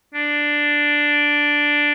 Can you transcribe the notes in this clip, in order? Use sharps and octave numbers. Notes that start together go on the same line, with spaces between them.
D4